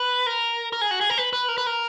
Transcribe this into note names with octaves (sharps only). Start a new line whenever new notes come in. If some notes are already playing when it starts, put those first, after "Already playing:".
Already playing: B4
A#4
A#4
G#4
F#4
G#4
A#4
B4
B4
A#4
B4
A#4